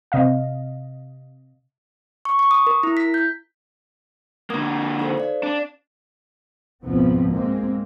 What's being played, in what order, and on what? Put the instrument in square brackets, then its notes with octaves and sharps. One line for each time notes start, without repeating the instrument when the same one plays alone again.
[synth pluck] C3 D#5 F5
[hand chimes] C#6
C#6
D#6
A#4
E4
B6
G6
[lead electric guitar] D3 A#3 [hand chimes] F#5 D#6 G#6
[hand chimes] D#4 A4 C5
D5 F5
[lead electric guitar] D4
[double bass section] C#2 G#2 B2 F3 B3 C4
G#2 G#3 A#3 C4